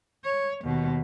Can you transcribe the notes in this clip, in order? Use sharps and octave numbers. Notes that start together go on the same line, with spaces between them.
C#5
D#2 B2